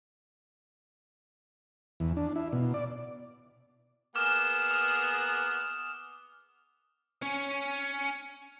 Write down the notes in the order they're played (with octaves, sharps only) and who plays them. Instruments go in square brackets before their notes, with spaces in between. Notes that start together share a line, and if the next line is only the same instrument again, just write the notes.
[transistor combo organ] E2
D4
E4
B2
D5
[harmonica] A#3 B3 G#4 [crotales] D6 F6 E7
[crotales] D#6
[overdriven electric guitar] C#4 C#5